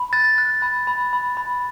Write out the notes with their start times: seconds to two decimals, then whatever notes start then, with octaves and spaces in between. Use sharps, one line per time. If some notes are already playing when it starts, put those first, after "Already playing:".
Already playing: B5
0.13 F#6 A6
0.38 F#6
0.62 B5
0.87 B5
1.13 B5
1.37 B5